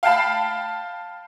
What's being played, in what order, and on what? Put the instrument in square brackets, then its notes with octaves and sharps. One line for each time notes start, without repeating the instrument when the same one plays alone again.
[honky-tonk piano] F5 G5 A5 B5